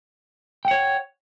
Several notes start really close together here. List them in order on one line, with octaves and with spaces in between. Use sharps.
G5 F#5 C#5